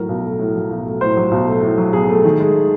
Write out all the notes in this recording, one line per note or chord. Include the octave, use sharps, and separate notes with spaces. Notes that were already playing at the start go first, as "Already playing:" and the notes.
Already playing: A2 F#3 A#4
B1
A3
A2
F#3
B1
A3
A2 C5
F#3
B1
A3
A2
F#3
B1 G#4
A3
D#3
G#3